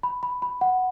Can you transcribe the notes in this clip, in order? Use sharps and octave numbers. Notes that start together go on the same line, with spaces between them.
B5
B5
B5
F#5